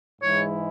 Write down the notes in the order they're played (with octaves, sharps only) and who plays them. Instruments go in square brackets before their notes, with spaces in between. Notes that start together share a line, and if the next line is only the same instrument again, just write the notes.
[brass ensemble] G#2 E3 G#3 E4 [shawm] C#5